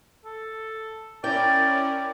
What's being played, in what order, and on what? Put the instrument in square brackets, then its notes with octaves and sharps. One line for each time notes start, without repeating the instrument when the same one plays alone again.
[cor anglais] A4
[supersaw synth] C#4 E4 A#4 [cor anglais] D5 [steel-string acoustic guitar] G5 [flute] A6